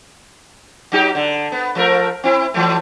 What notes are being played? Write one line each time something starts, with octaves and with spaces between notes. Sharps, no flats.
F#3 D#4 G4
D3
B3
F3 A3 A#4
C4 E4
E3 F#3 A3